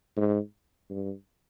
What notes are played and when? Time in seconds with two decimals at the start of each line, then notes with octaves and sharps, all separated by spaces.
0.17 G#2
0.90 G2